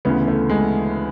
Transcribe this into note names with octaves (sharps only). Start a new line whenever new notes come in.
D2 C#3 E3 B3
A3
G#3